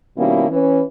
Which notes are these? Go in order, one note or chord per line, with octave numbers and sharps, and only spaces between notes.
B2 D#3 G3 A#3 C#4 E4
E3 C#4 B4